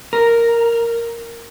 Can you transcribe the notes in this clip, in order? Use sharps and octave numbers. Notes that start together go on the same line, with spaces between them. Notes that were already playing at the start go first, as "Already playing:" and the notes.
A#4